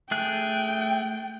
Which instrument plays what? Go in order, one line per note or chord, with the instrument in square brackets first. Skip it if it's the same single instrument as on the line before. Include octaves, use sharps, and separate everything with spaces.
[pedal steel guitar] A3 G#4 F#6 [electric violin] G5